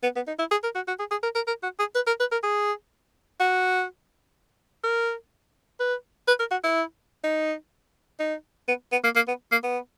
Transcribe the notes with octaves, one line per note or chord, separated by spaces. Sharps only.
B3
B3
D#4
E4
G#4
A#4
F#4
F#4
G#4
G#4
A#4
A#4
A#4
F#4
G#4
B4
A#4
B4
A#4
G#4
F#4
A#4
B4
B4
A#4
F#4
E4
D#4
D#4
B3
B3
A#3
A#3
B3
A#3
B3